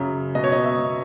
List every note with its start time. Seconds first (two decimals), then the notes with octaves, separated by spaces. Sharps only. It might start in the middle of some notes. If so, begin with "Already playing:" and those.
Already playing: F#2 C#3
0.35 B2 D#5
0.44 C#5
0.52 D#5
0.64 E5
0.79 B2